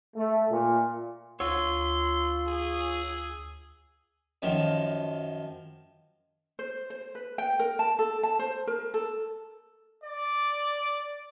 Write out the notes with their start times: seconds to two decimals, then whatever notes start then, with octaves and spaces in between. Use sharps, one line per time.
0.16 A3
0.50 A#2
1.40 D2 F4 C#5 C6 E6
2.47 G#4
4.42 F#2 D#3 F3
6.59 C5
6.90 C5
7.15 B4
7.38 G5
7.59 A#4
7.79 A5
7.99 A4
8.23 A5
8.39 C5
8.67 A#4
8.94 A4
10.04 D5